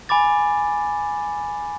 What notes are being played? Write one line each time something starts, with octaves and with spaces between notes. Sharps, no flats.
G#5 B5 D6 A6